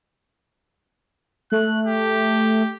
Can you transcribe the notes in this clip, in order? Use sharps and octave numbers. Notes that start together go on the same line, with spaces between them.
A3 F#6
G4